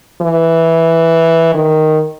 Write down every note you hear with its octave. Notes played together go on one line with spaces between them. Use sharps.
E3
D#3